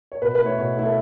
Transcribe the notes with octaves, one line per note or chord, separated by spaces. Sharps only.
C#5
B2 B4
B4
A3 E4 C#5
B2 C#5
A3 E4
A4